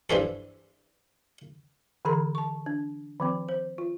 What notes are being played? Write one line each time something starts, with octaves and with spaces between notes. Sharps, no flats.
G2 E3 C4 A4
D3 E3 G#4 A#4 A#5 C6
A5 C#6
D4
D#3 F3 C4
C5
F4